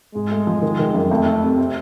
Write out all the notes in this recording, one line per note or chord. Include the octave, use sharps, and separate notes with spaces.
G#2 G#3
A3
F3
D#3
D#3
F#2
F2 A3
F2
C3
C4